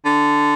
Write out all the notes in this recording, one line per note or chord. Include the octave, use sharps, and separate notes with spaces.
D3